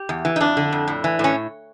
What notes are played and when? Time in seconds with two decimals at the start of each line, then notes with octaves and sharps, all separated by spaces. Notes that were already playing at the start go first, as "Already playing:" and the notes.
Already playing: G4
0.09 E2
0.25 E3
0.36 D#4
0.40 F2 D4
0.57 D3
0.72 F2
0.88 A2
1.04 E3
1.19 A2 C#4